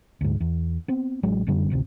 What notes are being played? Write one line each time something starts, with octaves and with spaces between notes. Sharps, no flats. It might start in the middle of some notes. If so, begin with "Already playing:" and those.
D2 G#2
E2
B3 C4
A1 F#3 G#3
F1 F#2 D3 G3
A1 D2 C3